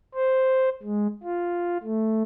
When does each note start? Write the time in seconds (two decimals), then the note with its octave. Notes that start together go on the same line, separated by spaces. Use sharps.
0.15 C5
0.83 G#3
1.23 F4
1.83 A3